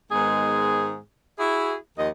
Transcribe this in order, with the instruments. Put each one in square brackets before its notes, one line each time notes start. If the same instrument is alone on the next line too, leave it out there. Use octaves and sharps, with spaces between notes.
[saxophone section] G#2 D#3 G#3 B3 G#4
E4 F#4 G#4 E5
D#2 F3 D#5